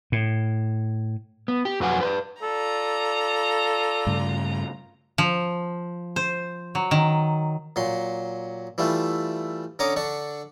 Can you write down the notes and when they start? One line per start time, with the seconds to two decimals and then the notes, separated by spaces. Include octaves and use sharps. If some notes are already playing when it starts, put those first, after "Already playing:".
0.12 A2
1.48 B3
1.65 G4
1.80 F2 F#3 B4 F#5 G#5
2.01 B4 C5 D5
2.42 F4 A4 D5 A#5
4.07 G2 C#3 A3
5.18 F3
6.16 C5
6.75 F#3
6.91 D#3
7.76 A#2 F#3 C6
8.78 E3 G3 A3 F4
9.79 D3 C#4 C#5 A#5 D6 D#6
9.96 D3 D4 C#6